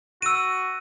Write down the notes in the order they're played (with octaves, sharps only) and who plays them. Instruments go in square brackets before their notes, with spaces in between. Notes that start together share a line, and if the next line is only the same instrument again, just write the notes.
[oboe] F#4 [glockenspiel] E6 D#7